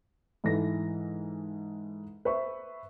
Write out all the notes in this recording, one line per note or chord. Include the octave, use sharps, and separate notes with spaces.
G#2 E3 A4 A#6
B4 C5 E5 C#6